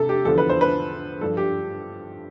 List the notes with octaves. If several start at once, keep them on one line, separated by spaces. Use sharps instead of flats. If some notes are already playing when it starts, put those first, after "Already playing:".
Already playing: C3 A4
G4
E2 D3 F3 A4
B4
C5
B4
G2 F3 A4
G4